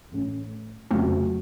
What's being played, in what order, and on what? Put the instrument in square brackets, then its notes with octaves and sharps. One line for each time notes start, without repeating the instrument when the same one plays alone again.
[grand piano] A1 A2 A3 C#4
[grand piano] F1 F2 C#3 F#3 [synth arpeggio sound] A3 C4